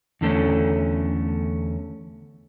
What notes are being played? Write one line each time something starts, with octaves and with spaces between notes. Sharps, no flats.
E2 D3 A3 C#4